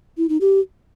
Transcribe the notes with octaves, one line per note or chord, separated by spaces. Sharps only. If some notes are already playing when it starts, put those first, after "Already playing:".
E4
D#4
G4